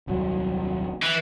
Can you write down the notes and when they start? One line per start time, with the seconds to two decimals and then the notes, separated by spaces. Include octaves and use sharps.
0.07 D#1 C2 F#3
1.02 E3